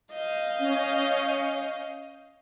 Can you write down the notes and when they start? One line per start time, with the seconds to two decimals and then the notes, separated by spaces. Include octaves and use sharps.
0.12 D#5 F5 G6
0.59 C#4